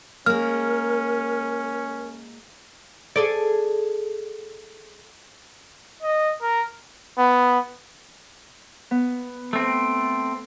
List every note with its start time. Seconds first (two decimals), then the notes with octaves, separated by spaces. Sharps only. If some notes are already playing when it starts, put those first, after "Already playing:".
0.26 G#3 A#3 C#4 A#4 F6
3.16 G#4 A4 D5
6.02 D#5
6.42 A#4
7.18 B3
8.91 B3
9.53 A3 C4